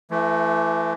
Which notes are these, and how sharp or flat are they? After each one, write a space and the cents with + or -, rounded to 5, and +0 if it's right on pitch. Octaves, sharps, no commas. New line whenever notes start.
E3 +30 A3 +0